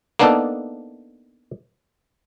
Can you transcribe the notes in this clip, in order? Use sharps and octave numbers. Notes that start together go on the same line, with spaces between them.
A#3 B3 D4 D#4 A4